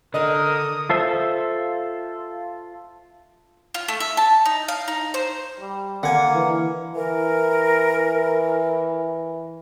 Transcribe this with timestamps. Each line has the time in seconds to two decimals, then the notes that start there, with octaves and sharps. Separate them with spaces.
0.14 D3 A#4 D#5 D#6
0.89 F4 A4 C5 E5
3.74 F4
3.88 A3
4.00 E5
4.17 A5
4.45 D#4
4.68 F5
4.88 D#4
5.14 C5
5.59 G3
6.03 D3 A#3 F#5 G#5
6.35 E3
6.95 E3 A#4